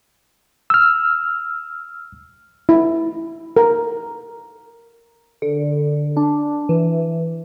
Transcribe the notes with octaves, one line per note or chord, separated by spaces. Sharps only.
E6 F6
E4
A#4
D3
D4
E3